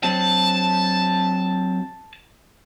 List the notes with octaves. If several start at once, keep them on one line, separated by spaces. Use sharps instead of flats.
F#3 C4 A5